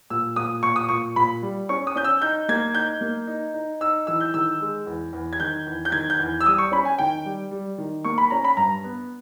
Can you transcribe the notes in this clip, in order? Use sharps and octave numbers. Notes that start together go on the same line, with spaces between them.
A#2 E6
A#2 D#6
A#2 C#6
D#6
A#2 C#6
A#2 B5
G3
C#4 C#6
D#6
C#4 G6
E6
D#4 G6
A#3 G#6
D#4 G6
A#3
D#4
D#4
D#4 E6
E3 E6
G6
D#3 E6
G#3
E2
E2
G#6
D#3 G6
E2
G6
D#3 G#6
G6
E2
E6
G3 D#6
C#6
C#4 B5
G#5
D#3 G5
G3
G3
D#3
A#3 C#6
B5
C#4 A#5
B5
G2 A#5
B3